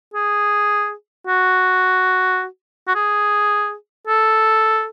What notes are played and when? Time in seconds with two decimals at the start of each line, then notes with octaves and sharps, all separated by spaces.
0.14 G#4
1.27 F#4
2.88 F#4
2.95 G#4
4.08 A4